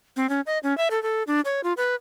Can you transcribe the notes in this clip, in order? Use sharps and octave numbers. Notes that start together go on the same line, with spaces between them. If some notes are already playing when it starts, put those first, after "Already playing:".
C4
C#4
D#5
C#4
E5
A4
A4
D4
C#5
F4
B4